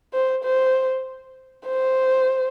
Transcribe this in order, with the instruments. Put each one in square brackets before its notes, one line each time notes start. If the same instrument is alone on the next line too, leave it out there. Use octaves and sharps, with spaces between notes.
[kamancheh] C5
C5
C5